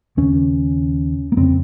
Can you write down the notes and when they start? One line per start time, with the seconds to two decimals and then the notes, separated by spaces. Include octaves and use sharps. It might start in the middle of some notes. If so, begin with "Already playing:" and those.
0.17 D#2 C#3 C#4
1.32 A#3
1.37 F2 C#3 C4